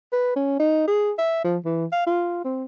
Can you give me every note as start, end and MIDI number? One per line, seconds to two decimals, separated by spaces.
0.13 0.35 71
0.36 0.57 61
0.60 0.85 63
0.87 1.12 68
1.18 1.40 76
1.44 1.57 53
1.65 1.85 52
1.92 2.07 77
2.07 2.40 65
2.45 2.65 60